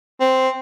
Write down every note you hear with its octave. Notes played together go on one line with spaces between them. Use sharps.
C4